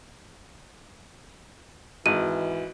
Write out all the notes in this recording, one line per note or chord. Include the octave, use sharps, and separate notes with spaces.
G#1 E3 F#4 D#5 D#7